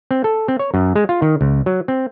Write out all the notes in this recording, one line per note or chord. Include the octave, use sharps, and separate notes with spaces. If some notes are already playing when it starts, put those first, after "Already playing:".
C4
A4
C4
C#5
F#2
G#3
F4
D#3
C#2
F#3
C4